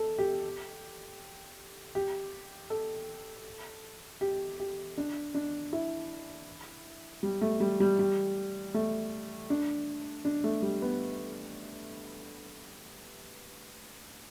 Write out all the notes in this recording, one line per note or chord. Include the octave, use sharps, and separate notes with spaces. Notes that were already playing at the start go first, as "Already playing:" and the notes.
Already playing: A4
G4
G4
A4
G4
G4
D4
D4
E4
G3
A3
G3
G3
G3
A3
D4
D4
A3
G3
B3